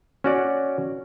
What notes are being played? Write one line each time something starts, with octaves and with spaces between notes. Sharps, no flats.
C#4 F#4 D5